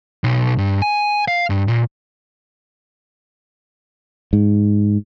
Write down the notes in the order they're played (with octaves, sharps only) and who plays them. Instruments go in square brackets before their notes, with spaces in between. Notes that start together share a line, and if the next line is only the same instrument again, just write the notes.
[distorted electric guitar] B1
G2
G#5
F5
G2
A#2
[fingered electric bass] G#2